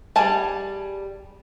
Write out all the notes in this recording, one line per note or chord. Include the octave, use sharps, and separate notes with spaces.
G3 G#4 G#5 A5